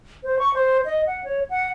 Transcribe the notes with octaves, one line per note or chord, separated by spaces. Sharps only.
C5
C#6
C5
D#5
F#5
C#5
F#5